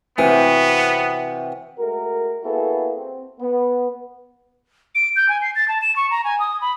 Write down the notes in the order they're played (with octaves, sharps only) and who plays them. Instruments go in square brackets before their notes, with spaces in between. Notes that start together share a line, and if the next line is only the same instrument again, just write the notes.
[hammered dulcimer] C3 F#4 [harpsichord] E3 [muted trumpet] B3
[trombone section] G#3 A3 F#4 A#4
A#3 B3 E4 F#4 G#4 A4
C4
B3
[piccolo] D7
G6
G#5
C7
A6
A5
E7
C#6
A#5
G#5
D#6
B5